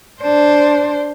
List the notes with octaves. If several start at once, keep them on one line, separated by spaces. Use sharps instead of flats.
D4 C5